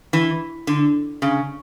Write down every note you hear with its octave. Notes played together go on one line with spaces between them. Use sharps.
E3
D3
C#3